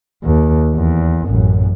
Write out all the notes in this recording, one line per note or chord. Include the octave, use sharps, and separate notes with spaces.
D#2
E2
A1 F#2